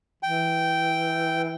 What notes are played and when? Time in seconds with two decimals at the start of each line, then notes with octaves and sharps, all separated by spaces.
0.23 E3 G5